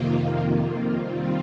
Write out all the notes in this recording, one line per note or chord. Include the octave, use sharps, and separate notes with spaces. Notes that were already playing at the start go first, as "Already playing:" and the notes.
Already playing: F2 C3 D#3 A#3 F4
D#3 G3 C4 F4